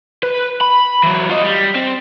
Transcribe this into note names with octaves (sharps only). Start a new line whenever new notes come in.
B4
B5
E3 F#3
F4 D#5
G3
C4